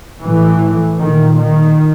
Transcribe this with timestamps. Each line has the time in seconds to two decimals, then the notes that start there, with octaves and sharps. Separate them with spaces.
0.20 A2 E3
0.98 A#2 D#3
1.37 D#3